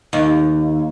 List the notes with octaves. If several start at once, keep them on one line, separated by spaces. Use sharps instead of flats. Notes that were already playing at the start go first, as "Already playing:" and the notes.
D#2